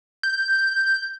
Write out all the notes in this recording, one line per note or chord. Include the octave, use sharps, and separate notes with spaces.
G6